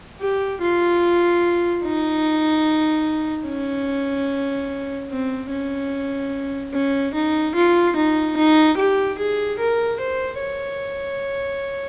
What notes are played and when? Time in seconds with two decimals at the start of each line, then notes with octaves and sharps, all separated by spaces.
0.20 G4
0.61 F4
1.84 D#4
3.47 C#4
5.10 C4
5.51 C#4
6.73 C#4
7.14 D#4
7.55 F4
7.96 D#4
8.36 D#4
8.77 G4
9.18 G#4
9.59 A#4
10.00 C5
10.40 C#5